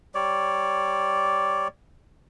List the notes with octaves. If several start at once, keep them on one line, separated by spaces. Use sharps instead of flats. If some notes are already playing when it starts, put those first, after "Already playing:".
G3 C#5 D5